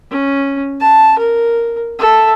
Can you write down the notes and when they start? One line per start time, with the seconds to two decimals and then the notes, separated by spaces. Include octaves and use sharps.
0.11 C#4
0.80 A5
1.18 A#4
1.99 A4 E5